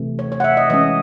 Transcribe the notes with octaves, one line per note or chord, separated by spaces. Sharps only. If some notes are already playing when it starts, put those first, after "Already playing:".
Already playing: C3 E3 A3
C#5
C#5
F#5
E5
D#5
E3 G#3 C#4 D#5